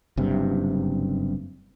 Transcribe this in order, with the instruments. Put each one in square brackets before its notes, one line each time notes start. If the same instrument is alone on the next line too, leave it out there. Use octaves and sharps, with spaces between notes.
[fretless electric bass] F#1 G2 C3